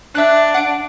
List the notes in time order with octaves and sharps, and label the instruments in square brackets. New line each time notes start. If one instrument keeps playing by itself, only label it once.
[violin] D4 [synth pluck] E5 F#6
[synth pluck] F#5 D7